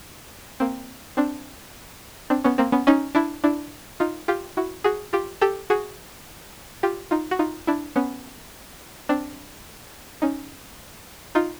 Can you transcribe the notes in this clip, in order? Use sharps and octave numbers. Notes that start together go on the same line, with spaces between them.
A#3 C4
C4 D4
C4 D4
B3 C#4
A#3 C4
B3 C#4
C#4 D#4
D4 E4
D4 E4
D#4 F4
F4 G4
E4 F#4
F#4 G#4
F4 G4
G4 A4
F#4 G#4
F4 G4
D#4 F4
F#4
D#4 F4
D4 E4
B3 C#4
C4 D4
C#4 D#4
D#4 F4